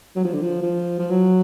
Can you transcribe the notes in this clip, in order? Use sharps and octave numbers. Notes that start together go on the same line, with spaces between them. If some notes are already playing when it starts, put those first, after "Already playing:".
F#3
F3
D3
F3
F3
F3
F#3